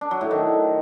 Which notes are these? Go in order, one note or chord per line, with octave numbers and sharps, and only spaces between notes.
D4
F#3
A2
D#3